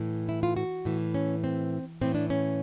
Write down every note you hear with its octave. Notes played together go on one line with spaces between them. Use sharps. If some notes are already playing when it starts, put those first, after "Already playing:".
Already playing: A2 E3
E4
F4
F#4
A2 E3
C#4
C4
A2 E3 C4
D4
C#4